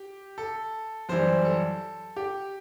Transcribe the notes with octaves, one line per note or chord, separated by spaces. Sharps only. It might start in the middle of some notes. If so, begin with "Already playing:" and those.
Already playing: G4
A4
F#2 E3 G3 C5
A4
G4